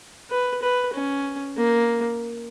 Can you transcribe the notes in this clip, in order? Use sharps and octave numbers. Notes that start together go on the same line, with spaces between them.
B4
B4
C#4
A#3